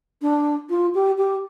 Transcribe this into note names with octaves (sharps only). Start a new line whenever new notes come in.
D4
F4
G4
G4